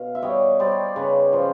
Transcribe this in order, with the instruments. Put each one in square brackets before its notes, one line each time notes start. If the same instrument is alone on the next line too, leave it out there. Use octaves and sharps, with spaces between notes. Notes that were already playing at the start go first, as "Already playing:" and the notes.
Already playing: [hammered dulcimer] B2 F5
E5
G3 C#5 D#5
G3 C5 D5
C#3 B4 C#5
F3 C5 D5